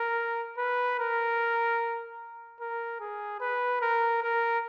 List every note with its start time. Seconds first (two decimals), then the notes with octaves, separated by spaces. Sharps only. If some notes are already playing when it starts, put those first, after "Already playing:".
Already playing: A#4
0.58 B4
0.99 A#4
2.60 A#4
3.00 G#4
3.40 B4
3.81 A#4
4.22 A#4